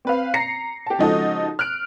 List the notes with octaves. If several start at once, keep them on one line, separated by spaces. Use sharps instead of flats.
C4 B4 F5
A#5 A#6 C7 C#7
G4 A5
C#3 F3 G#3 D#4 F#4 A4
F6 F#6 D7